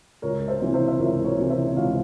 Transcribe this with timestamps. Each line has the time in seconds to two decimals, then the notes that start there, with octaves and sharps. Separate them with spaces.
0.22 C#2 A#4 C#5
0.48 C5 E5
0.61 C3 E3
0.74 C5 E5
0.88 E5
0.99 C#2 A#4 C#5
1.25 A#4 C#5
1.38 C3 E3
1.50 C5 E5
1.77 C#2 C#5 F5